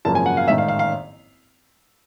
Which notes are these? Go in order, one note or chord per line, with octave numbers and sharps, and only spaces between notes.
G#1 F#2 C#3 F3 A#3 A5
G#5
F#5
F5
A1 G#2 D#3 E5
F5
F5
F5